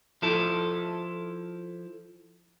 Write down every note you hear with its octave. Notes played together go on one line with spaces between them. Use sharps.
F3 E4 A4